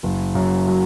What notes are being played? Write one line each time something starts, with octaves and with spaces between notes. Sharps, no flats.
F#1
F#2
F#3